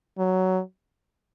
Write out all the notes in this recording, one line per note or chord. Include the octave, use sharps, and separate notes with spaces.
F#3